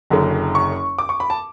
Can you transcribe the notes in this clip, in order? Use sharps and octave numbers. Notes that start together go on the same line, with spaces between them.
F#1 F#2 D3
C#6
D6
C#6
B5
A5